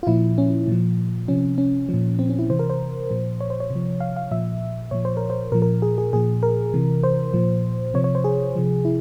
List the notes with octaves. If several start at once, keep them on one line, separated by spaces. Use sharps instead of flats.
F4
A#2 F3 E4
C#4
A#2 F3
C3 F3 C#4
C#4
A#2 F3
C4
C#4
E4
C3 E3 C5
A#4
C5
A#2 F3
C#5
C5
C#5
C3 F3
F5
F5
A#2 F3 E5
A#2 F3 C#5
C5
A#4
C5
A#2 F3 A#4
A#4
G#4
G#4
A#2 F3 G#4
A#4
C3 E3
C5
A#2 F3
C3 F3 C#5
C#5
C5
G#4
C3 F3
E4